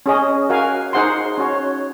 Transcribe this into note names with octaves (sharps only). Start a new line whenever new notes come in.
C#4 G#4 D#5
F#4 A#4 F5 G#5
D#4 G#4 C5 F#5 C6
C#4 F#4 C#5